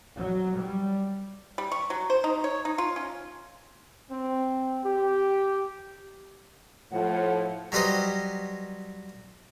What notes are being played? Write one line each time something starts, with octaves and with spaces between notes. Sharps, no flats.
F#3
G3
G3
C#6
F#3
C5
D#4
C#5
D#4
F4
C#4
C4
G4
A2 F3 F#5
F#3 G3 B4 C5 D#5